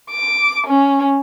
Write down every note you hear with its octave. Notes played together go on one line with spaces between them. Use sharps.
D6
C#4